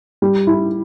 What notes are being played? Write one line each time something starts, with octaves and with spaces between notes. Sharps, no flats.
G3
E4